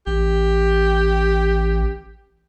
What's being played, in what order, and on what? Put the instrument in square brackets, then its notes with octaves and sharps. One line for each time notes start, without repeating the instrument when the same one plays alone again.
[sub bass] A1 [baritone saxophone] G4